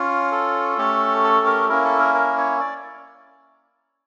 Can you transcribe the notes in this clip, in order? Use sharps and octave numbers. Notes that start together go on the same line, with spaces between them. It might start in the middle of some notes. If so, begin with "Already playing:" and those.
Already playing: C#4 F4
A4
A3 C#4 G4
A4
A#4
A#3 C#4 E4 A#4
A4
A#4
A#4
C#5
D5